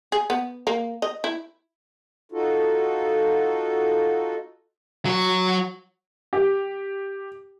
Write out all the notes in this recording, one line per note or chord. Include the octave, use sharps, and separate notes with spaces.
G#4
B3
A#3
D#5
E4
D#4 F4 F#4 A4
F#3 C#5
G4